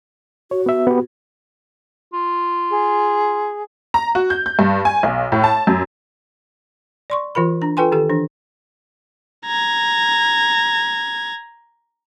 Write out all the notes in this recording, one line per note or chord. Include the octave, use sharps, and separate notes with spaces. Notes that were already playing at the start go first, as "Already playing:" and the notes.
F#4 C#5
B3 E5
B3 G4
F4
G#4
A#5
F#4
G6
G6
G2
G#5
B1
A2
A5
F#2
D5 C6 C#6
E3 F4 A#4 B5
D4 A#5
F4 A4 B4 G5 G#5 C6
D#3 G4 A4
E3 D4
A#5 G#6